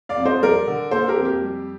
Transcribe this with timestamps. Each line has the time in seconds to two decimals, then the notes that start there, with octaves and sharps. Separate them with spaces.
0.09 D5 F5
0.17 F2
0.25 C5 D#5
0.42 G3 A#4 D5
0.67 D3
0.91 A#3 A4 C5
1.08 G4 A#4
1.17 F2
1.25 G4
1.42 G3